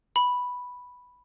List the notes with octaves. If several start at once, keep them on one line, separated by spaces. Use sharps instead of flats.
B5